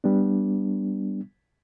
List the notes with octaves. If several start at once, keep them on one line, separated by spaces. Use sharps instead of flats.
G3 B3 D4